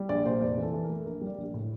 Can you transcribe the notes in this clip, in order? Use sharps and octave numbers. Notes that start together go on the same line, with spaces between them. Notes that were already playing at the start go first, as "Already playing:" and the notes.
Already playing: G3
A#1 D5
A#2 C5
F1 D5
E3 A4
E3
A#4
A3
A#1 A#4
G3
D5
A#1
A2